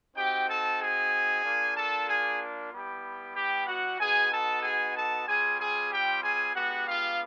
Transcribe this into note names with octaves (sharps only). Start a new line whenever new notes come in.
C4 D#4 F#4 G4 G5
A4 A5
G#4 G#5
A#3 D4 F4
A4 A5
G#4 G#5
G3 B3 E4 G4
G4 G5
F#4 F#5
B3 D#4 F#4 G#4 G#5
A4 A5
G#4 G#5
A4 A5
G3 C4 F4 G#4 G#5
G#4 G#5
G4 G5
G#4 G#5
G#3 B3 D4 F#4 G4 F#5
F4 F5